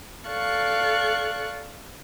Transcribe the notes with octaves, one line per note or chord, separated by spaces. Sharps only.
A4 D5 F5 C#6 F#6